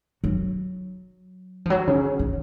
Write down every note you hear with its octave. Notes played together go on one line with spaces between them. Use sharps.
F#3
F3
F#3
C#3
D#3